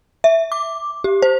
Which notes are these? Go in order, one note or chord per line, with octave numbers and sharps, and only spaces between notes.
E5
D6
G4
C5